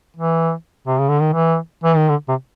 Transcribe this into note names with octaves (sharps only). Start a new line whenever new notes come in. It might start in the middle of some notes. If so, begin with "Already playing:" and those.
E3
C3
C#3
D3
D#3
E3
E3
D#3
D3
C3